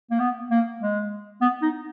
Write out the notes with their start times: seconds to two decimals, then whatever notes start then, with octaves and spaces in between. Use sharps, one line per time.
0.11 A#3
0.20 B3
0.51 A#3
0.81 G#3
1.41 B3
1.62 D#4